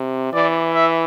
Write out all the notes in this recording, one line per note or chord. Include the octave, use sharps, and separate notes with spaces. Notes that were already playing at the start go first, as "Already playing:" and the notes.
Already playing: C3
E3 D5
E5